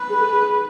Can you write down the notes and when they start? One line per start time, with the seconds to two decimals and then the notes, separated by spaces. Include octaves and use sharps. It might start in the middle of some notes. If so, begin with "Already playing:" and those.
Already playing: B4
0.09 G#4
0.19 A4
0.24 G#4